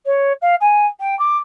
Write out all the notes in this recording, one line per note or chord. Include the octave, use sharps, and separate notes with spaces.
C#5
F5
G#5
G5
D6